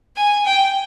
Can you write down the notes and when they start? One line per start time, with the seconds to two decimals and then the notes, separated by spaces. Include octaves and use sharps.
0.16 G#5
0.45 G5